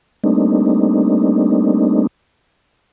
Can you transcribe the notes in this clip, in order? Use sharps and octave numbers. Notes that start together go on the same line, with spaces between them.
G3 A3 A#3 C4 D4 D#4